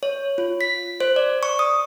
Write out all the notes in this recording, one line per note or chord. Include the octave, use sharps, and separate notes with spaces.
C#5
F4
B6
C5
D5
C#6
D#6